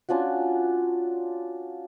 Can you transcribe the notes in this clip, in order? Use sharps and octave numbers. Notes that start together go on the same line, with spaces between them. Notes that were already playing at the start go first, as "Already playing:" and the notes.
C#4 D4 F4 F#4